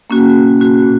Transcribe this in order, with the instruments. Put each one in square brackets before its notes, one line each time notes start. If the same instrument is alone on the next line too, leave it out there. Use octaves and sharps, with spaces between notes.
[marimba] A#3 C#4 F#4
B2
A#3 C#4 F#4
A#2